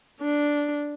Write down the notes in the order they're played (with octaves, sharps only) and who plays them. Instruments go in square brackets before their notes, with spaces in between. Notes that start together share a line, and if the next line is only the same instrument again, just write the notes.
[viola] D4